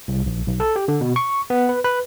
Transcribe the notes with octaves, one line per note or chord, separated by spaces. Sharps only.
C2
A#1
B1
A4
G4
D3
B2
C#6
B3
B4
B4